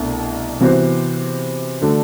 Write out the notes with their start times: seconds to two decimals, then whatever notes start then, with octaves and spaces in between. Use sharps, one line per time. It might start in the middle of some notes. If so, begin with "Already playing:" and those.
Already playing: C2 B2 A3 D4
0.60 C3 E3 B3 F#4 C5
1.82 D3 A3 D4 F#4